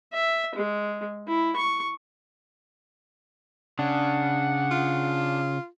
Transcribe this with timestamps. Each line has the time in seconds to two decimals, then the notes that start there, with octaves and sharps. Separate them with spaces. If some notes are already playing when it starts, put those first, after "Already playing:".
0.13 E5
0.55 G#3
1.28 E4
1.56 C#6
3.79 C#3 D4 F#5
4.71 F4